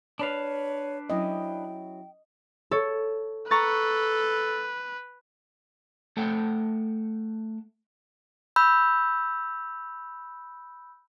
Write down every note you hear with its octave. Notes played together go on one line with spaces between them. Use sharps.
D4 B4 C#5 F5
F#3 C#4 E4 D#5 G5
A4 C#5
A4 B4 A#5 C#6 A6
A3 A4 F#5 G5
B5 E6 G6